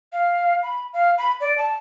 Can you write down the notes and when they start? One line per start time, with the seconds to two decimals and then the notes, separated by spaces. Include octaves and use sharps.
0.13 F5
0.63 B5
0.93 F5
1.18 B5
1.40 D5
1.58 A5